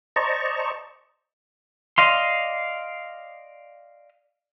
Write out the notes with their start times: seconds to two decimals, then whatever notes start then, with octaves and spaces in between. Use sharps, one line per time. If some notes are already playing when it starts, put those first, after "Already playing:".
0.16 C5 D5 D#5 A5 A#5 C#6
1.98 D5 D#5 F5 C6